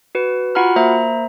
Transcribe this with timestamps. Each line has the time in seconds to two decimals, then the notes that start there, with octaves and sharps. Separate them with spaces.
0.15 F#4 B4
0.55 F4 F#4 F#5 A#5 B5 F6
0.76 A#3 C5 E5 A#5